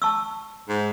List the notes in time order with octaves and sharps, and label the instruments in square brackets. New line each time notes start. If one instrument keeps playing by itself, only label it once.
[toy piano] A5 C#6 E6
[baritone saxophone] G#2